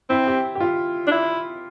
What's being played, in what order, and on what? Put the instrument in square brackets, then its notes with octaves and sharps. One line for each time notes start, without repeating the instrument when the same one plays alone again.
[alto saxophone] C4 [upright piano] E4
[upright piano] G4
G4
F4
[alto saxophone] D4
E4